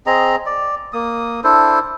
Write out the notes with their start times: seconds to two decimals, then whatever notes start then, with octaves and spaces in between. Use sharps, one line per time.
0.06 C4 G#4 D#5 A#5
0.46 D5
0.93 A#3 D#6
1.44 D4 E4 A4 C5